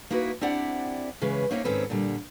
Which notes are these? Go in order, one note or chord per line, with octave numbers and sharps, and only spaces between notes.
A#3 D#4 E4 F#4 A#4 B4
C4 D4 E4 G4 D5 F#5
C#3 E3 G#3 C#4 B4
A#3 C4 C#4 D#4 C#5 E5
G#2 D#3 C4 C#4 A4 B4
A#2 D3 G3